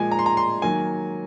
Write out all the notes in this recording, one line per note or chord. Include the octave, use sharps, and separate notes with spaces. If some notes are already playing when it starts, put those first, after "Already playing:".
Already playing: A#2 F3 G#3 G#5
A#5
C6
A#5
C6
D#3 F#3 A#3 G#5